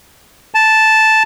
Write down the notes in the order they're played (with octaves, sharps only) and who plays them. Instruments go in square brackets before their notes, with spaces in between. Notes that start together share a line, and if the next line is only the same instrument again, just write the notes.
[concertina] A5